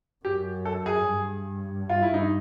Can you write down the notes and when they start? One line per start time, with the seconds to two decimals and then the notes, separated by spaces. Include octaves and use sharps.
0.25 F#2 G4
0.65 A4
0.86 G#4
1.07 G2
1.90 F4
2.02 E4
2.14 D#4